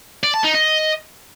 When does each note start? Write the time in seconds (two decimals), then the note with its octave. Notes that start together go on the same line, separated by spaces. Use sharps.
0.24 D5
0.34 A5
0.44 D#4
0.55 D#5